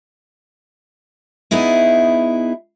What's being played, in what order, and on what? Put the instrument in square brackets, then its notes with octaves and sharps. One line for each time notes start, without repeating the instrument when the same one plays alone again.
[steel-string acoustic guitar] B3 D#4 E4 G#4